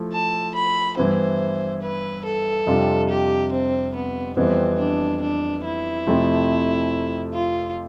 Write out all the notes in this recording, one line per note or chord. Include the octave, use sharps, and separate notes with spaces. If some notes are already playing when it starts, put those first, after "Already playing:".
Already playing: F3 A3 E4
A5
B5
G2 E3 B3 E4 C5
B4
A4
F2 C3 G3 D4 F4
G4
C4
B3
F2 E3 G3 B3 C4
D4
D4
E4
F2 C3 F3 A3 C4
F4